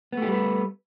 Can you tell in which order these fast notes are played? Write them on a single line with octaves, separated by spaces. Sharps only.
B3 A3 G4 G3 B4